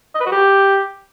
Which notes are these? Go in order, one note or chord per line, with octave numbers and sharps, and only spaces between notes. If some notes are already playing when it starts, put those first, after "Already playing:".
D#5
B4
F#4
G4